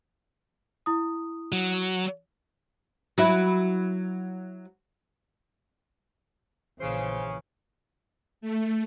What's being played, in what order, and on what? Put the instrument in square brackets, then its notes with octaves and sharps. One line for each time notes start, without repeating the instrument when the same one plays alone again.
[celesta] E4 D#6
[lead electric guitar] F#3
[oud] F#3 E4
[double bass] A#1 E3 [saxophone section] C#3 [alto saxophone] C5
[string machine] A3